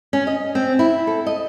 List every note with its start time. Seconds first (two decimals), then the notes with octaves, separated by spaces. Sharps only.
0.13 C#4
0.27 D#5
0.55 C4
0.79 E4
1.07 A4
1.26 D#5